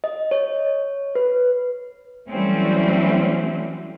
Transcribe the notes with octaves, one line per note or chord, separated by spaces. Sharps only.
D#5
C#5
B4
E3 F#3 G3 A3 C4 C#4